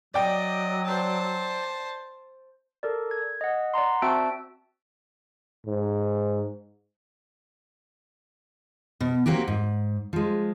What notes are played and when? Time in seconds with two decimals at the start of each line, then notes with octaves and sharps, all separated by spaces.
0.14 F#3 D5 D#5 G5
0.85 C5 A5
2.83 A4 A#4 D5
3.11 G#6
3.41 D#5 F#5
3.74 D5 F#5 A#5 C6
4.02 C4 F#4 E5 A5 E6 D7
5.66 G#2
9.01 B2
9.26 F#3 G3 A#3 C4 F#4 G4
9.48 G#2
10.13 F3 G#3